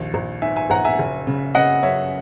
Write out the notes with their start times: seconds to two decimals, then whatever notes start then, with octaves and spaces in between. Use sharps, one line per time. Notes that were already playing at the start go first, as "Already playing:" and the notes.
Already playing: A#1 D#2
0.14 A#1
0.42 G#2 E5 G#5
0.56 E5 G#5
0.70 A#1 F#5 A#5
0.85 E5 G#5
0.99 F#1
1.27 C#3
1.55 C#3 D#5 F#5
1.83 F#2 C#5 E5